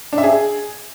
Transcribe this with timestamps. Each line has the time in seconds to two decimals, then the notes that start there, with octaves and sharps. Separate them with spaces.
0.13 D4
0.18 E5
0.23 G#4